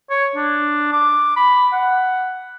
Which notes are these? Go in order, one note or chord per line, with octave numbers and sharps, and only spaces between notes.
C#5
D4
D6
B5
F#5